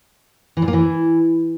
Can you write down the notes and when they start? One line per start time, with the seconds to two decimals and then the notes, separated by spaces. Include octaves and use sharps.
0.57 E3
0.62 A#2
0.68 A#3
0.73 E3